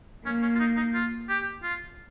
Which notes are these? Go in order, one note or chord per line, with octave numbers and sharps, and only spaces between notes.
A#3 C#4
C#4
F4
D#4
D#4
F4
G4
F4